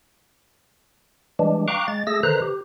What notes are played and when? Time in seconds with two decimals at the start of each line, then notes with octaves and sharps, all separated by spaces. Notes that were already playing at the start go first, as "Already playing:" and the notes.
1.39 E3 G3 G#3 D4
1.68 F5 G5 A#5 C#6 D6 F#6
1.88 G#3 A6
2.07 A3 G#4 E6 A#6
2.23 D3 D#3 B4 C5 A#5 F#6
2.42 G4